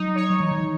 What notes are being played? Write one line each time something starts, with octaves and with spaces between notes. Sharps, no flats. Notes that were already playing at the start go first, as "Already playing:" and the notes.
Already playing: F#3 D#4
C#5
F#3
E3
D#3
E3